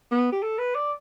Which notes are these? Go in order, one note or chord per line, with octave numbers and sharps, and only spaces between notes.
B3
G4
A4
B4
D5